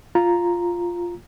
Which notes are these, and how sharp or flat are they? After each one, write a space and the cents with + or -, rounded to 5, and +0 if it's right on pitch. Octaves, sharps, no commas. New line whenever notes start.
F4 +0 A#5 +0